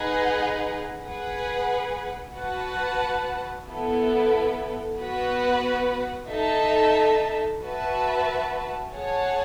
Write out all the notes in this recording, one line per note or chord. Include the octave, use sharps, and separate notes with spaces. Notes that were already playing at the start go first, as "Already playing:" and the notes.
Already playing: D#4 G#4 B4 F#5
G#4 B4 F#5
F#4 B4 F#5 A5
B3 E4 A4
B3 F#4 B4 F#5
D#4 A4 E5 A5
F#4 B4 E5 A5
G#4 C#5 F#5 A5